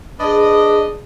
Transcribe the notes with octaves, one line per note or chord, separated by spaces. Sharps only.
D4 G#4 B4 D5 D#5 B5